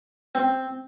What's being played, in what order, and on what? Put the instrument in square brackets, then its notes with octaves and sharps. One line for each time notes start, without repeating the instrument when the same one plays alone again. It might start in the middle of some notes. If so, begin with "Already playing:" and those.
[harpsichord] C4